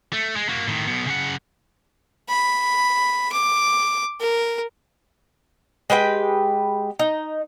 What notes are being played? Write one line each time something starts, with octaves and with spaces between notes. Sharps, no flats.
A3
G#3
A#3 F#4
A2 D#3
B1 B2
C#3 F#5
B5
D6
A#4
G#3 G4 B4 G5
D#4